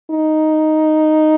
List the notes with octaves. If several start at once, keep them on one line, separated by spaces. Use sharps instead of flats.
D#4